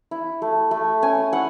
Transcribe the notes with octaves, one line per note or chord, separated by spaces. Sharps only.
E4
A3
A3
C#4 G#5
E4 F#5